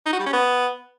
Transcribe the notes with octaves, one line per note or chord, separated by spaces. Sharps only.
D#4
F#4
G3
C#4
B3